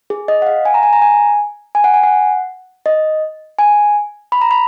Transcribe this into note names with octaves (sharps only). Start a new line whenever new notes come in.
G#4
D#5
F#5
F5
G#5
A#5
G#5
A#5
G#5
G#5
F#5
G#5
F#5
D#5
G#5
B5
A#5
B5